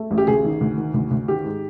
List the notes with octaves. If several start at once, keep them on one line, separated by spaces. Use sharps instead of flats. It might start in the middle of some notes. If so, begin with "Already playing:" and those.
Already playing: A3
A1
G4
D2 G#4
D#3
D2
D#3
D2
D2
D#3 G4
G#2